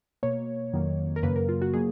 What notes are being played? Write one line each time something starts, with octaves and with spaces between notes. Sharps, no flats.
B2 A#3 C#5
F2 D#3 F#3 A#3
A#4
F#2 C#3 F#3 A#3 B4
A#4
F4
F#4
B2 F#3 A#3 G#4